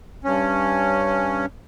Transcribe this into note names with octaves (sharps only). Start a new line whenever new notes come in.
G2 C#4